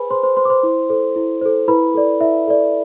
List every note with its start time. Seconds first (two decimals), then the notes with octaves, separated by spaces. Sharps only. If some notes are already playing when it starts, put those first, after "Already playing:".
Already playing: G#4 B4 C5 G#5 B5
0.11 G#4 C5 C6
0.23 C5 C6
0.37 C5 C6
0.45 D6
0.50 C5 C6
0.63 E4
0.90 A4 C5
1.16 E4
1.41 A4 C5
1.68 E4 B4 B5
1.95 A4 D5
2.20 E4 E5
2.47 A4 D5